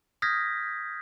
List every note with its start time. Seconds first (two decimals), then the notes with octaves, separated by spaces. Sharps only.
0.22 D#6 F6 G6 G#6 A#6 B6